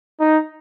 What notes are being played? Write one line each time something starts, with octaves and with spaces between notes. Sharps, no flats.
D#4